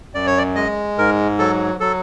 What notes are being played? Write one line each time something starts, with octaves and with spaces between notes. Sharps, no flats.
F#2 D5
C#5
D5
G#3 D#5
G#2 A#4
F#3 A4
F#3 A4